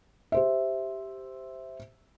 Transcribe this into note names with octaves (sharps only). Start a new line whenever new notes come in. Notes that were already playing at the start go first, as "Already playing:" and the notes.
G4 C5 E5